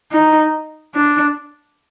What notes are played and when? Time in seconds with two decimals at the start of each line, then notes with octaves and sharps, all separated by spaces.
0.12 D#4
0.95 D4